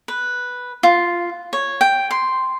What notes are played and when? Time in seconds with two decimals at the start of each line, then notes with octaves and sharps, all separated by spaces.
0.08 B4
0.83 F4
1.53 C#5
1.81 G5
2.11 C6